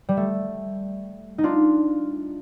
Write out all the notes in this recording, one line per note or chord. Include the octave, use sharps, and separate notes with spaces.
G3
A3
D#4
D4 F4